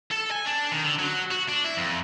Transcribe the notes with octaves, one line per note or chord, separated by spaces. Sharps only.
A4
G#5
D4
D#3
D3
F#3
F#4
D4
E4
F2